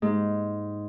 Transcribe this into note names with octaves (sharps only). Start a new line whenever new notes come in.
G#2